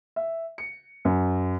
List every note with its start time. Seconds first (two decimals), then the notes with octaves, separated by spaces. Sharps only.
0.16 E5
0.58 C#7
1.05 F#2